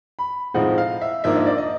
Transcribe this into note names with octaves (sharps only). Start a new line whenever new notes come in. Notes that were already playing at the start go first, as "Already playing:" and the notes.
B5
A2 F3 G#3 C4 D#4 F#5
F5
E5
G#2 F3 A#3 D4 E5
D#5
D5
D#5